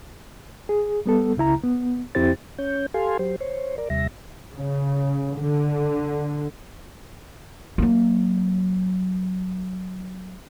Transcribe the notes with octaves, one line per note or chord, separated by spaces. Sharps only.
G#4
G3 B3 A4
C#2 C#3 E4 A#5
B3
F2 C4 E4 G4 C5 A6
C#4 C#5 G6
G4 A4 F5 G#5 C6
F#3 G4 C5
C5 C#5
A#4 D5
D#2 C3 G3 E5 A#6
C#3
D3
F#3 A#3